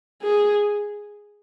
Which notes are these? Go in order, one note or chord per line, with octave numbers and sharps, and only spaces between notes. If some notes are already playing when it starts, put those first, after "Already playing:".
G#4